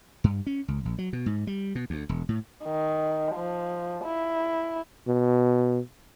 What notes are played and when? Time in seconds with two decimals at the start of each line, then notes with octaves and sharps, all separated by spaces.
0.24 G2
0.47 C#4
0.68 C#2
0.85 A#1
0.98 F#3
1.13 B2
1.26 G#2
1.47 G3
1.75 B2
1.90 D2
2.09 E1
2.29 A2
2.64 D#3
3.36 F3
4.04 E4
5.07 B2